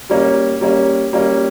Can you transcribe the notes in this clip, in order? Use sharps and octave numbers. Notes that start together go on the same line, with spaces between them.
G3 A#3 C#4
G3 A#3 C#4
G3 A#3 C#4